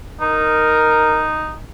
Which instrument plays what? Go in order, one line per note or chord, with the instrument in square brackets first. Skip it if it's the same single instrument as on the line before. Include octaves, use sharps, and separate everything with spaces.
[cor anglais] D#4 [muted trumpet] A#4